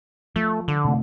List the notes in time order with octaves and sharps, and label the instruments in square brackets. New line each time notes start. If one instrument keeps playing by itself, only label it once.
[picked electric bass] F3 [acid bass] A3
[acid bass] D3
[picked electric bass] C3 A3